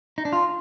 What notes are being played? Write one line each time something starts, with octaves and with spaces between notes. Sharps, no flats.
D#4
D4
F4